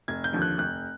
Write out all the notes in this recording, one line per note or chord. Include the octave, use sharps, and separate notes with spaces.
F1 G#6
G6
D#2 D3 F3
F#6
F1 F#6